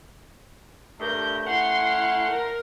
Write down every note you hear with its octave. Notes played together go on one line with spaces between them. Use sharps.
G2 A3 A#4 G6
C#4 E4 F5 F#5 C6
A#4